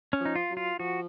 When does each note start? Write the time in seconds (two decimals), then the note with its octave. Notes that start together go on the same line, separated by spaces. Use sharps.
0.13 C#4
0.21 F3 D#4
0.36 F4
0.50 F#3
0.57 F4
0.80 F3 F#4